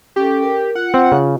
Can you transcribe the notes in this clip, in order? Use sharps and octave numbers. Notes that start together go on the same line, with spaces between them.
C#4 G4 A4
A#4
F4 F#5
C4 F4
C#3